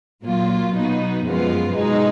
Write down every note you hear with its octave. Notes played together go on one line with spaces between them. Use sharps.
A#2 F#3 A#3 F4
B2 F#3 B3 D#4
F#2 F3 G#3 B3 F4
B2 G#3 D#4